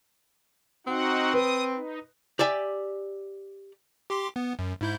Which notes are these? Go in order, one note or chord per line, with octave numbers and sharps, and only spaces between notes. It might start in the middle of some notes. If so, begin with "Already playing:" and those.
C4 D#4 F#4 F#5
B4 D#6
D#4
G4 D5 E5 G#5
G4 C6 D6
B3
F#2
G#2 E4 G6